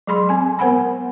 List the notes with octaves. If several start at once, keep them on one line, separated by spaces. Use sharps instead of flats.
F#3 G#3 G#4 B5 C6
C4 G#5
B3 A#4 C5 F#5 G#5 B5